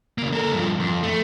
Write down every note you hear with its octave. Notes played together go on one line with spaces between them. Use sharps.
C#3 A#3
A4 A#4
G2 F3
F2
A3